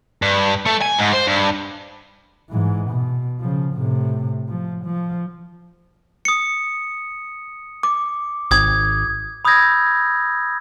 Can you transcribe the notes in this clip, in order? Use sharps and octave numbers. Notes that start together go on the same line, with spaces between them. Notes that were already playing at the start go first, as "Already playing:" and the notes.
G2
A3
G#5
G#2
C5
G2
G#2 E3
B2
C#3 F3
A2 C3
F3
F3
D#6 C#7
D6
G#1 D#6 G#6
B5 D#6 E6 G6 G#6 A#6